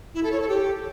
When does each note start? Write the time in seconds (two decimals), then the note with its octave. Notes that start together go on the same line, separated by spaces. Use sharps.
0.14 E4
0.23 A4
0.32 C#5
0.40 A4
0.49 G4